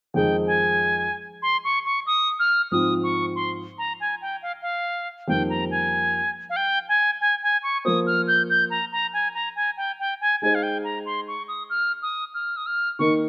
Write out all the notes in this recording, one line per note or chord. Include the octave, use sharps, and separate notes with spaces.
F2 D#3 G#3 D#4 G#4 G5
G#5
C6
C#6
C#6
D#6
F6
G#2 F3 C4 F4 D#6
C#6
C6
A#5
G#5
G5
F5
F5
F2 D#3 G3 A#3 G5
A#5
G#5
F5
G5
G#5
G#5
G#5
C#6
F3 A#3 F4 C5 D#6
F6
G6
G6
A#5
A#5
G#5
A#5
G#5
G5
G5
G#5
G#3 D#4 G#4 C5 G#5
F5
G5
A#5
C6
C#6
D#6
F6
D#6
F6
D#6
F6
D#3 A#3 D#4 A#4 C#6